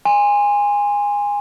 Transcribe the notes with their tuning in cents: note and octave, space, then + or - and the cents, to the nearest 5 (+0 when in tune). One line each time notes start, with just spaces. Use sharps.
G#5 -20 C6 +0